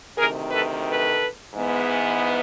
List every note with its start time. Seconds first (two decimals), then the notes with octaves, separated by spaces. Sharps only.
0.17 D2 C3 D#3 G#4 A#4
0.51 A4 B4
0.86 A4 B4
1.55 G#2 E3 G#3 B3